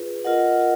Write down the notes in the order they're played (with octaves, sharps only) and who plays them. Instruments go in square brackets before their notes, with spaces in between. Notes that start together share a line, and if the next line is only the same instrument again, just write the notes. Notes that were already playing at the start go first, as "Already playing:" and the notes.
Already playing: [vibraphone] F4 G#4 B4
F4 A#4 D#5 F#5